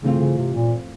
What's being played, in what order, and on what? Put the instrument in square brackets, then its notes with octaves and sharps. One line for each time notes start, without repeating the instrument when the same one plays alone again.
[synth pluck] G2 E3 A3 C4 F4 [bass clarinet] C#3
[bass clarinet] C#3
C3
A#2